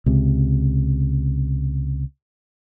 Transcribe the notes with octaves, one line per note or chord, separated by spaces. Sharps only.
C#2 C3